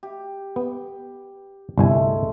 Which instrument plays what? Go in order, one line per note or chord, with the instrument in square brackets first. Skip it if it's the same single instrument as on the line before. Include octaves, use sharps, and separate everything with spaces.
[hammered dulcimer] G4
[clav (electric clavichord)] B3 [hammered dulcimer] G5
[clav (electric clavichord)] G1 C2 G#5 [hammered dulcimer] G#3 A3